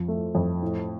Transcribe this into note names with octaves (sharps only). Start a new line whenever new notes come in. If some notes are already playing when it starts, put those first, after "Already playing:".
Already playing: F2 F3
A3
F2
A2